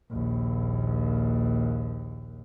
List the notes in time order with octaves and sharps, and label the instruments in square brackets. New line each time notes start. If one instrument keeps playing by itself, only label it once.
[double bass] A#1 D#2